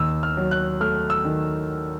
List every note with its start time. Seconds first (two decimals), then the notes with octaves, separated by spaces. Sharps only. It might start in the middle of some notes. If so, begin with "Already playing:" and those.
Already playing: D#2 E6
0.23 F6
0.37 F#3
0.51 F#6
0.81 A3 F6
1.10 E6
1.25 D#3